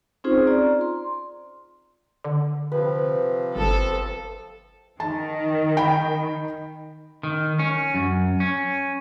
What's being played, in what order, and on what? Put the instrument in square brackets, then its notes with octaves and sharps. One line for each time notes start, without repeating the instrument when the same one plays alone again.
[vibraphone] C4 C#4 D#4 F4 G#4 C5
F4 D5 A#5
C6
[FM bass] D3
[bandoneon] C3 F3 [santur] B4
[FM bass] G1 [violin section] A4
[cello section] D#3 [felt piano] A5
[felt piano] G5 B5
[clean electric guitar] D#3
C#4
F#2
C#4